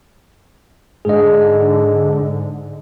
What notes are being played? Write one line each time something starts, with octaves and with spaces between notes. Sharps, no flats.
G#2 D3 G#4 D#5